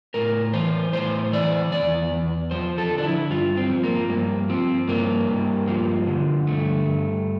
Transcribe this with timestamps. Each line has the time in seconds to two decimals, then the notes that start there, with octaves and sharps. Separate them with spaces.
0.14 A2 A#4
0.53 E3 C5
0.93 A2 C5
1.32 E3 D5
1.72 E2 D5
2.12 E2
2.51 F3 C5
2.78 A4
2.90 D3
2.98 D4
3.05 E4
3.30 G2 F4
3.57 C4
3.70 F3
3.83 A#3
4.09 G2 A#3
4.49 F3 C4
4.88 G2 A#3
5.29 G2
5.68 F3
6.07 D3
6.47 G2 A3
6.86 G2